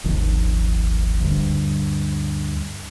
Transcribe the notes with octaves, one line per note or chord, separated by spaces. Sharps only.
D#1 G#1 D#3 F3
D2 G2